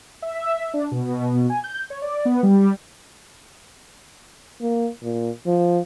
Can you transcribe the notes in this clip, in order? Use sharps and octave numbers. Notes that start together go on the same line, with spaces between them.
E5
D4
B2
G#5
G6
C#5
D5
B3
G3
A#3
A#2
F3